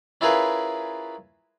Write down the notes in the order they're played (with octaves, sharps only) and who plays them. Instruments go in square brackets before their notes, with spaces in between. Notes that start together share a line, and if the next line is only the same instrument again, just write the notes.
[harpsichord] C#4 E4 F4 G#4 A#4 B4